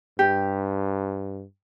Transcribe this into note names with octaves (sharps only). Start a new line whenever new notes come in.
G2 G4